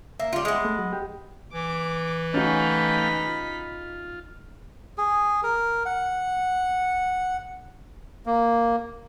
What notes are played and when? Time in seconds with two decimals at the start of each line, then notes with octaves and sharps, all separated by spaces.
0.20 A#3 E5
0.33 G3 F4
0.45 G#3 B3
0.65 A3
0.79 F#3
0.93 G4
1.53 E3 D6
2.34 A3 C#4 D#4 F#4 F5 G5 B5
3.25 F4
4.98 G#4
5.43 A#4
5.86 F#5
8.26 A#3